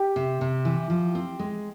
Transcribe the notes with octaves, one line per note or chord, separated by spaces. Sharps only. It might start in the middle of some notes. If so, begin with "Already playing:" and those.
Already playing: G4
C3
C3
E3
F3
C4
G#3